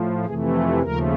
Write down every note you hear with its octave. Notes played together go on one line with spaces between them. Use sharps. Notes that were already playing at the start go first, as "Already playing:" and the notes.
Already playing: A2 F3
F2 C3 E3 A3 G#4
A4
D#2 C#3 F3 A3 A#4